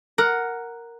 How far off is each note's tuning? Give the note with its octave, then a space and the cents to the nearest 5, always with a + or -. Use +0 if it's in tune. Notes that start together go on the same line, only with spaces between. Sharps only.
A#4 +0 F#5 +0